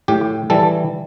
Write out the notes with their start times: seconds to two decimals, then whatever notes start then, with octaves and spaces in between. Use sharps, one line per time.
0.08 A2 G4
0.50 E3 G3 A4